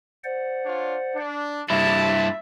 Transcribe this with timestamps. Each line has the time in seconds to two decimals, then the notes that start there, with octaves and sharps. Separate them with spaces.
0.24 C5 D5 F#5
0.66 D4 F4 C#5
1.15 D4
1.70 G2 E4 G4 E5 A5